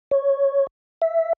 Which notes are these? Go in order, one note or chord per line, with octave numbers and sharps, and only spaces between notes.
C#5
E5